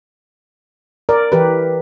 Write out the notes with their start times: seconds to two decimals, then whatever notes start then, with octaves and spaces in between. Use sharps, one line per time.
1.09 A#4 D5
1.32 E3 G4 B4